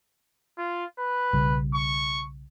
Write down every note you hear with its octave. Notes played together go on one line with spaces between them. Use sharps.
F4
B4
B1 C#3 G3
C#6